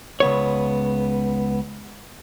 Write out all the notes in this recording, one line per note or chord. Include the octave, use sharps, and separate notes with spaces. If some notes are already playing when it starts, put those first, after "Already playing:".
C#2 B3 C#5